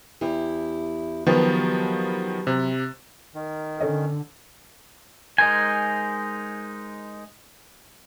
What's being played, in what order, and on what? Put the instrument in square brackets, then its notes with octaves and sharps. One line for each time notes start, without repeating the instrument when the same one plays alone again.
[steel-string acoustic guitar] E2 E4 G4
[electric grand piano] D#3 F3 B3 [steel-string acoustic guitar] F#3 G4 B4
[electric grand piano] C3
[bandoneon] D#3 [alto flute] A#4
[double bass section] D3 [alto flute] C#4 [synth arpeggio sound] A4 C#5 D#5
[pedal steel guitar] G#3 D#4 A#4 C5 G#5